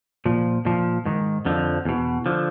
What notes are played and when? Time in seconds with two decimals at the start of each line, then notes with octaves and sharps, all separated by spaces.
0.25 A#2 F3
0.65 A#2 F3
1.06 G#2 D#3
1.45 F2 D3 F3
1.85 E2 B2
2.26 D3 F3